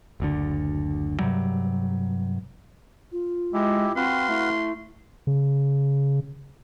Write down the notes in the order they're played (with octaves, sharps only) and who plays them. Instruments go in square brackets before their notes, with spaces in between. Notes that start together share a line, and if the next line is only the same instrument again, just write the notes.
[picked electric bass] F#1 D2 D3
G2 C3 F#3 G3
[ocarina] F4
[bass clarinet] G#3 [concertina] E4 G4
[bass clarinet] C4 [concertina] F#4 B4 F5 [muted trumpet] C6
[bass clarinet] A3 [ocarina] E4
[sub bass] C#3